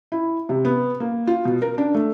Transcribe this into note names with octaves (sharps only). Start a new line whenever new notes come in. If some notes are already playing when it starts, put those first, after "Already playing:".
E4
C3
B3
A#3
F4
B2
A#4
D4
A3